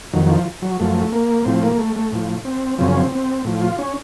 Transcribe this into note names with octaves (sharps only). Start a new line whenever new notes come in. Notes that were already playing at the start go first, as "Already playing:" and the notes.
F2 D#3 F#3
F#3
F3
F#3
F#2 F3 A3
A#3
A2 F3 C4
A#3
A3
A3
A2 F3
C4
F#2 C#3 F3 C4
C#4
C4
C4
A2 F3
F4
C#4